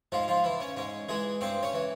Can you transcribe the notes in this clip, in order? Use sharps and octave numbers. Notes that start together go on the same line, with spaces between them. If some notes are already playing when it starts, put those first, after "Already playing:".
G#2 F3 F4
F3 F4
E3 E4
C#4
G#2 C#4
E3 G#3 G#4
G2 C4 C5
C#4 C#5
E3